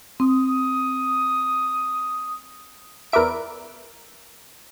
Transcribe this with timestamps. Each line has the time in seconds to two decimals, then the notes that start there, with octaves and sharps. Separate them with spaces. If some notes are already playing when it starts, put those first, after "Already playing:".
0.20 C4 D#6
3.12 E2 A#4 B4 D5 E5 D7